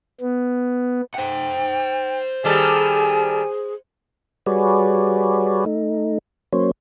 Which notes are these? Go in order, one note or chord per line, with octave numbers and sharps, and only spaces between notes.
B3
C5 F#5 G5
D#3 G3 G#4 A4 G#5
G3 F#4 G#4 B4 C#5 D5
A3 D#4
F#3 A#3 C#4 C5 C#5